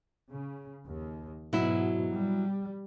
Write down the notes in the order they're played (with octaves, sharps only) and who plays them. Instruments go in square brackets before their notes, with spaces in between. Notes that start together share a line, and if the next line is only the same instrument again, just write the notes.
[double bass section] C#3
D#2
[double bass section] G#2 B2 [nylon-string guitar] F#3 E4
[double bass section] G3